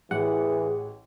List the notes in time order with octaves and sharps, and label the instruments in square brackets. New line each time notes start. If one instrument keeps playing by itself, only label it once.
[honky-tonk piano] A1 [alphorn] E3 [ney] G#4 [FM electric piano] F#5